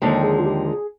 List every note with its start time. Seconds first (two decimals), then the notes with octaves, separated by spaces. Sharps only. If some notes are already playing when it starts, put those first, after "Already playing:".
0.01 D#2 D3 F3 G#3 D#4 G5
0.23 G#4
0.39 F4
0.46 G4
0.67 G#4